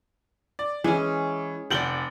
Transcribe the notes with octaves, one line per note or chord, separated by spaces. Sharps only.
D5
E3 G#3 C#4
F1 D5 F#5 G5 F#7 G7